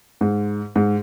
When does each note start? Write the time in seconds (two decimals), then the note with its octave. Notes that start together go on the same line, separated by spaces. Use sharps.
0.21 G#2
0.76 G#2